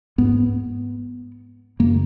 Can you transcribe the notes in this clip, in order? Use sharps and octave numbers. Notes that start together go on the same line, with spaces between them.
G#2 B3
F#2 C#3 A#3